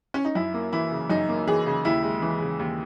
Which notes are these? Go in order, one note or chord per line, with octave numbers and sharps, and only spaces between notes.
C#4
D#4
F#2 E4
A#3
E3 E4
C#3
F#2 D#4
A#3
E3 G#4
C#3
D#2 E4
G#3
E3
C#3
D#2